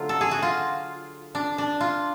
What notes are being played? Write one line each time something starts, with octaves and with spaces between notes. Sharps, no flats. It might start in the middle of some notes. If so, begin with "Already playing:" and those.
Already playing: D3 F#3 A3 F4
A4
G#4
F#4
F4
D4
D4
F4